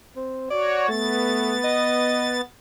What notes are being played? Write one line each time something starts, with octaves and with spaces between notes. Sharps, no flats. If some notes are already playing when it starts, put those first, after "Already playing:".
C4
F#4 C#5 D5
A3 B3 A6
D#5